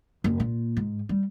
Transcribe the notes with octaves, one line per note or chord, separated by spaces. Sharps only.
F#1
A#2
G#2
G3